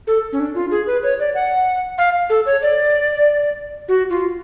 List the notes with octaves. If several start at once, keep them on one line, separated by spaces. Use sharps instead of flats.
A4
C#4
D4
F4
G#4
B4
C#5
D5
F#5
F5
A4
C#5
D5
F#4
F4